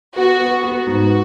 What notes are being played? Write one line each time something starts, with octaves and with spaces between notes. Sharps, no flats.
B3 F#4
B3
B3 F#4
G#2